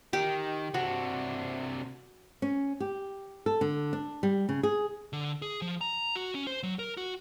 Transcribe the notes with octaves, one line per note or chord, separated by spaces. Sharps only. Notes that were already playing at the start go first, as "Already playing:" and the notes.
D#3 G4
C3 D4 F#4
C#4
G4
A4
D3
D4
G3
C#3
G#4
D3
G#4
F3
A#5
F#4
C#4
C5
F#3
A#4
F#4